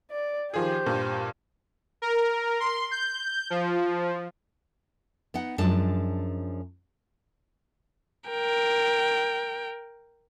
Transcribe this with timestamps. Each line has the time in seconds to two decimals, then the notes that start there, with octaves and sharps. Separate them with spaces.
0.11 D5
0.54 D#3 F3 G4 G#4 C5
0.86 G2 A#2
2.02 A#4
2.60 C6
2.91 G6
3.50 F3
5.34 B3 D#4 F#5
5.58 F#2 F3 G#3 D4 A5
8.28 A#4 G5